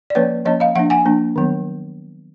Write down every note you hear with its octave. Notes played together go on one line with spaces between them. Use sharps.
D5
F3 A#3 C#4 B4 C#5
F3 A#3 C#4 C#5 D#5
D#5 F5
F3 A#3 D4 E5 F#5
F#5 G#5
F3 A#3 D4
D#3 F#3 B3